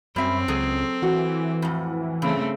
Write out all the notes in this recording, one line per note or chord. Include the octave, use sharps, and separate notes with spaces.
F#2 G3 C4 E5
C#2 F#3 G#4 A4
E3 F#4
F2 A2
G2 C#3 A3 C4